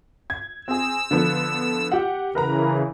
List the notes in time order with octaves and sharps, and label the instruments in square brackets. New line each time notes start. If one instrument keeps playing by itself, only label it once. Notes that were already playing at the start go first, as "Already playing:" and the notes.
[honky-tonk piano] G#6
[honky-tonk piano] C4 G#4 [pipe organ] E6
[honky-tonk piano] D3 F3 B3
G4 F#5
[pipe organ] C#3 E3 [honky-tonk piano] A#4 B4 A#5